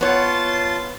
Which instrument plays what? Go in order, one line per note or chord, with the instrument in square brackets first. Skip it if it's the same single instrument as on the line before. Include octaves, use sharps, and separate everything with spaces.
[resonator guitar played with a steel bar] B3 C#5 [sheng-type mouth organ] F4 A5 C6